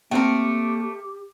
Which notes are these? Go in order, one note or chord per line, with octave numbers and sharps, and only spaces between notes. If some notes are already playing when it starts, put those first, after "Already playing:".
A3 A#3 C4 G4 A#4 F#5 G5